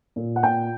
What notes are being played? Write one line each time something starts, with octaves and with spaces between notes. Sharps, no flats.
A#2
F#5
A#2 G5